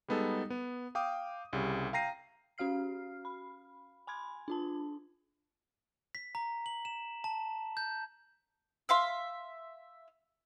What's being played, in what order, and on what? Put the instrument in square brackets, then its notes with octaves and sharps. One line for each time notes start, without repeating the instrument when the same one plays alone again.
[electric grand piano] G3 G#3 B3 D#4 A4
B3
F5 G5 D6 D#6
C2 C#3 G3
F5 G5 A#5 A#6 C7 D#7
[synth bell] C#4 F#4 F5 F6 C7
B5
G#5 B5 C6 G#6
D4 F4 A5
[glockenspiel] B6
A#5
F#7
E7
A5
G6
[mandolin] E5 F5 C6